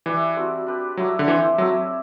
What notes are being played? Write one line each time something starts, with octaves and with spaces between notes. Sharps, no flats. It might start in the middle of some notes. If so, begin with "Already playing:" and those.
E3 E4 G4 B4 D5
G3 C4 F#4 A4
D4 G4 B4
F#3 A3 E4 G4
D3
E3 C4 G4 C5 E5
F#3 A3 C4 E4 A4